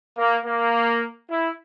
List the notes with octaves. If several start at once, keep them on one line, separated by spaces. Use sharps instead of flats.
A#3
A#3
E4